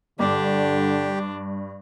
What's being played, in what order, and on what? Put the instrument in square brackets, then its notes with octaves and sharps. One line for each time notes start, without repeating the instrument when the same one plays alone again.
[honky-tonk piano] G2 [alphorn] D3 [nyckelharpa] D4 [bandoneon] G4